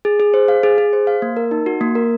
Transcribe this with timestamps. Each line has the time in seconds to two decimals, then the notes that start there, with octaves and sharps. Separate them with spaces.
0.05 G#4
0.20 G#4
0.34 C5
0.48 F5
0.63 G#4
0.78 G#4
0.93 C5
1.07 F5
1.22 A#3
1.37 A#4
1.51 D#4
1.66 F#4
1.81 A#3
1.95 A#4